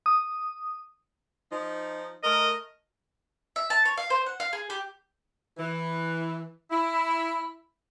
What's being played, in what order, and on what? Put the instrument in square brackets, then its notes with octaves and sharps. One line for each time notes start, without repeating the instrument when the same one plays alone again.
[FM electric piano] D#6
[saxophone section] F3 D#4
[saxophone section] A3 A#4 [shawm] D#5
[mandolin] E5
A5
C#5
F5
C5
F#5
F5
G#4
G4
[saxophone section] E3
E4